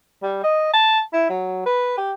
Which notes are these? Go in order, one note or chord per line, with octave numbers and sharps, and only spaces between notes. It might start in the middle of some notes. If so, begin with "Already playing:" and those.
G3
D#5
A5
E4
F#3
B4
G4